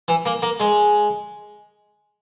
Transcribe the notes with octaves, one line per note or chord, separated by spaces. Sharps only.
E3
A#3
A#3
G#3